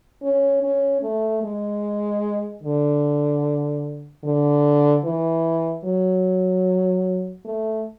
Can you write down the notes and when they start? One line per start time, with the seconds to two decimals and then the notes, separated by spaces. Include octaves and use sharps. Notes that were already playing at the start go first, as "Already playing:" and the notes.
0.23 C#4
0.63 C#4
1.02 A3
1.44 G#3
2.63 D3
4.24 D3
5.04 E3
5.85 F#3
7.45 A3